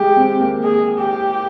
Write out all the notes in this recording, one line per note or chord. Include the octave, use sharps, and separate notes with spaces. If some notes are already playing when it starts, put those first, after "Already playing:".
Already playing: G#3 G4
C4
A#3
G#4
G4